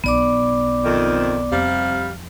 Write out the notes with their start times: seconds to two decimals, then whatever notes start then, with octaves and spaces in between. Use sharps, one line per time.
0.04 B1 B3 D5 D6
0.84 F2 D#3
1.52 F2 C3 G3 F5